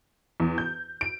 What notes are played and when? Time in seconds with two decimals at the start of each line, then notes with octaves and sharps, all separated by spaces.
0.40 E2
0.58 G6
1.01 D7